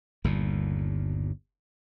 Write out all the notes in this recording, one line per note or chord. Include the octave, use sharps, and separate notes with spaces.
G1 D#2 A#2